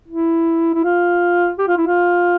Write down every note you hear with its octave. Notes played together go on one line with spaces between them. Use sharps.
E4
E4
F4
G4
F4
E4
F4